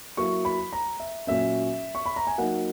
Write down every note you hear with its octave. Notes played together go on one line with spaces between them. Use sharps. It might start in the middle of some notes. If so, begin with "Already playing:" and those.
F#3 A#3 E4 C#6
B5
A#5
E5
A#2 F#3 A#3 C#4 E5
C#6
B5
A#5
G#5
F#3 A#3 D#4 F#5